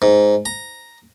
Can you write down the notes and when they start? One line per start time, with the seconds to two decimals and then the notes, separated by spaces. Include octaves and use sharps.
0.02 G#2
0.46 A#5